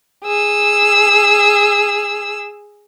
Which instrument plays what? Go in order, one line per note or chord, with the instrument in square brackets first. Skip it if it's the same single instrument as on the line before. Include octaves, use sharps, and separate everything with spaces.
[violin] G#4 E6